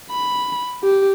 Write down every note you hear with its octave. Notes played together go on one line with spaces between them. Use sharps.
B5
G4